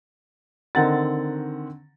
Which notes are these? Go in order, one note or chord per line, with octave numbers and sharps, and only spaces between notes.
D3 D#3 C4 F#5 A#5 A6